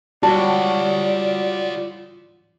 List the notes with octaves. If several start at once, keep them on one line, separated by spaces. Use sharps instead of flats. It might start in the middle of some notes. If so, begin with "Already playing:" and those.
G3 F4 F#4 C#5 D5 A5